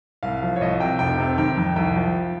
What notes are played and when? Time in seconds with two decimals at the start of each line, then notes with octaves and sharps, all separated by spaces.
0.23 C2 F5
0.43 F3
0.56 C#5
0.61 C2 D#5
0.80 C3 G5
0.99 F1 G5
1.18 C3
1.37 D#3 G5
1.57 F2
1.76 C2 G5
1.96 F3